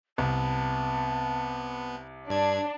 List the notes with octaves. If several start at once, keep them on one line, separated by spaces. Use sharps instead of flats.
C2 B3 A5
G2 D4 G#6